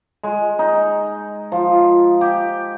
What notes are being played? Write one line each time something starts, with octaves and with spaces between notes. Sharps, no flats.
G#3
D#4
F3
G4